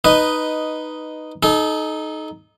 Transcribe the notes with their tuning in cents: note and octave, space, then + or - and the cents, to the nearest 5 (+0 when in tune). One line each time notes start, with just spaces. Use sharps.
D#4 -5 B4 +0 D#5 +0
D#4 +0 A4 -35